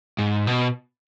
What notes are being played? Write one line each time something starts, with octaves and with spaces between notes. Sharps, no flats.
G#2
B2